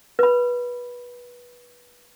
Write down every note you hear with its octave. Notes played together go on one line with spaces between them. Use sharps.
B4 B5